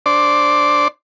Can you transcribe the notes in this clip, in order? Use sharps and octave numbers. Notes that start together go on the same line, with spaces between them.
D4 C5 D5